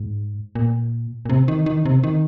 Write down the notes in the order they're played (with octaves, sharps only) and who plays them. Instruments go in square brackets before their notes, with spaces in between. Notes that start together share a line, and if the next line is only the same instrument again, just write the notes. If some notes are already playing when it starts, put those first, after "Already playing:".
Already playing: [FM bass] G#2
A#2
A#2
C3
D#3
D#3
C3
D#3